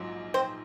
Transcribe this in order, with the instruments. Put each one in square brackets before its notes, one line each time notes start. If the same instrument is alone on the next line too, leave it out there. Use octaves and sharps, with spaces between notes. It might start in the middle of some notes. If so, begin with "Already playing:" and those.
Already playing: [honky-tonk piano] A#1 G#2 F#3
[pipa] C4 C5